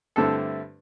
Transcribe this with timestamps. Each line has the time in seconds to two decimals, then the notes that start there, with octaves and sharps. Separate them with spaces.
0.16 G2 D3 A3 C4 E4 A4